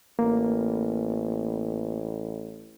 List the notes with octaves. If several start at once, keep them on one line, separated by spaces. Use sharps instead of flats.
A1 A#3